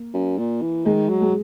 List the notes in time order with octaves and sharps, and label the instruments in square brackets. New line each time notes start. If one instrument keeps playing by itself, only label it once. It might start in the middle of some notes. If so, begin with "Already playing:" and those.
Already playing: [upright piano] A#3
[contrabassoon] F#2
A#2
E3
[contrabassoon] D#3 [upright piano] G#3
[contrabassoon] F#3
[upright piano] G#3